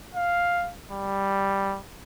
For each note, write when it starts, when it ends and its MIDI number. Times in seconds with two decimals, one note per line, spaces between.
0.15 0.71 77
0.91 1.79 55